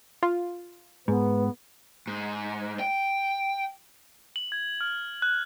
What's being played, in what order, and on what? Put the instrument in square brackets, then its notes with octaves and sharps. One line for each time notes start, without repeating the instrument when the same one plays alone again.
[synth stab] F4
[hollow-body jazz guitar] G#2 [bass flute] B3 [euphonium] B4
[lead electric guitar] G#2
G5
[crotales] F#7
G#6
F6
F#6